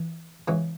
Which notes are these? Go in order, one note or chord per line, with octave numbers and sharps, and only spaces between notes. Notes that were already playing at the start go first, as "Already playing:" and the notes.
Already playing: E3
C#3 E3 G#3